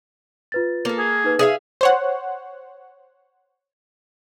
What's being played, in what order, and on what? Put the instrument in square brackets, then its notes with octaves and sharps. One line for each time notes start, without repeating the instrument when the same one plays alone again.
[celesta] F4 B4 A6
[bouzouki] A#3 A4
[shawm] G#4
[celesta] D#4 B4
[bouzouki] G#4 E5 F5
[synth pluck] C5 C#5 F#5